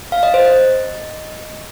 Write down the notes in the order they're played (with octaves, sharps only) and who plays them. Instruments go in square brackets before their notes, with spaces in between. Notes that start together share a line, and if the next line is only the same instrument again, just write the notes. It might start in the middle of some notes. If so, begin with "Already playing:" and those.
[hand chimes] F5
D#5
C5
D#5